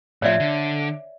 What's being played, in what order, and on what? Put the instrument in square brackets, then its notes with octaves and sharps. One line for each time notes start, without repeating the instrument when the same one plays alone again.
[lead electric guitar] A2 F3 [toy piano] C#5 D5 E5
[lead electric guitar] D3